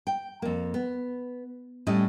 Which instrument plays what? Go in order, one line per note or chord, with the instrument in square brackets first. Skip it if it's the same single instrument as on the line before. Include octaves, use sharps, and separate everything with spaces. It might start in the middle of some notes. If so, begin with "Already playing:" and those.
[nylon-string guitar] G5
F2 A#3
B3
A2 G3 C#4 D#5